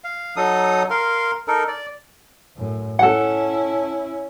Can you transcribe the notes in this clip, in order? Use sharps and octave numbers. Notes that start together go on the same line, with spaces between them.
F5
F#3 D#4 A4 D#6
A#4 F5 C6
D#4 A4 A#4
D5
F#2 A2
C#4 E4 A4 F#5